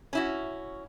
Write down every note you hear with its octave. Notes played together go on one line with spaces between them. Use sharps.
C#4 E4 F#4